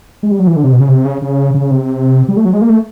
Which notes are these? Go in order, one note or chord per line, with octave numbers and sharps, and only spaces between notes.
G#3
G3
F#3
E3
D3
C3
B2
C#3
C3
C#3
C#3
C#3
C3
G3
A3
F#3
G#3
A#3
A3